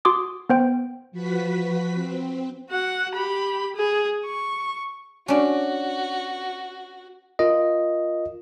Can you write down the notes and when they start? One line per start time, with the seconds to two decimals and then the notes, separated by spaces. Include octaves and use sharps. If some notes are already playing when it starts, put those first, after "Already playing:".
0.05 F#4 C6 D6 D#6
0.49 B3 C5 G5
1.12 F3 F#4 B4 B6
1.94 C4
2.70 F#4 F#5
3.15 G4 B5
3.76 G#4
4.25 C#6
5.28 C#4 D4 F#4
7.39 F4 A#4 D#5